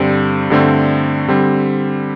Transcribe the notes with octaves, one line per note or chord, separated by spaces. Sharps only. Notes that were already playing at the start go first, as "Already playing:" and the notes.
Already playing: G2 D3 G3 C4 C5
G2 D3 A3 C4
D3 G3 C4